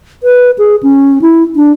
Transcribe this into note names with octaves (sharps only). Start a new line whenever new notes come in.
B4
G#4
C#4
E4
D4